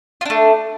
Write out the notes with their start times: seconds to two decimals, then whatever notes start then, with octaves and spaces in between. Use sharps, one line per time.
0.21 F4
0.26 D4
0.30 A3